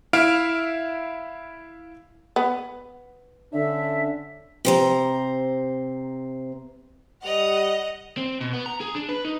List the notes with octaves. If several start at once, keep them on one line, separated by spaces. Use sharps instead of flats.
E4 E5 F5 F6 D7
B3
D3 C#4 D4 E5
C3 C5 A#5
G3 D#5 F#5 F7
C4
B2
B3
A#5
G#4
D4
B4
D#4